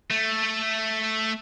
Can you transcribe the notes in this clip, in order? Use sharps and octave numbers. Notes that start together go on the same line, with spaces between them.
A3